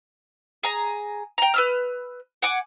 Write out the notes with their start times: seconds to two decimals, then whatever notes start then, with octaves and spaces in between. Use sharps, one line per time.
0.63 G#4 A#5
1.38 G5 A#5
1.54 B4 E6 F6
2.42 F#5 G#5 D6